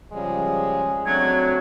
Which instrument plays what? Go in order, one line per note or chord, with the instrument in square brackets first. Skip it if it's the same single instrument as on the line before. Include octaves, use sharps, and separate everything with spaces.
[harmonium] C#3 F3 G3 [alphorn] G#3
[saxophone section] F#3 [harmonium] A3 C4 D4 [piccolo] G#6